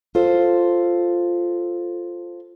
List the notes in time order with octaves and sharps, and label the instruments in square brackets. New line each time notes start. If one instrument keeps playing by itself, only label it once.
[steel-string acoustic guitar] F4 A4 C5